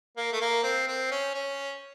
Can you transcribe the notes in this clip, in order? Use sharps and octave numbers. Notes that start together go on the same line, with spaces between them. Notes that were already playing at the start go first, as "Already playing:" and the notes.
A#3
A3
A#3
C4
C4
C#4
C#4